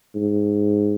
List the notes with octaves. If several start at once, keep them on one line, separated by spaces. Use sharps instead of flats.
G#2